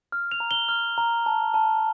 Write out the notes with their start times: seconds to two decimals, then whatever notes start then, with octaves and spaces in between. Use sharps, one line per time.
0.12 F6
0.32 F7
0.40 A#5
0.51 G7
0.69 F6
0.98 A#5
1.26 A5
1.54 A5